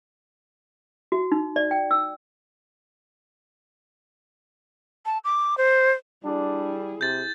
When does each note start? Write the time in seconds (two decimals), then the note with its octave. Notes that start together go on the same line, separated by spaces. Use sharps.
1.12 F#4
1.32 D#4
1.56 D5
1.71 G5
1.91 E6
5.05 A5
5.24 D6
5.57 C5
6.24 G3 D4 E4 G#4
7.01 C3 G6 A6